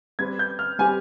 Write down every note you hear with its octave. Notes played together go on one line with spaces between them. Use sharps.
G3 C4 G4 B4 G#6
G6
F6
G3 C4 G4 B4 G#5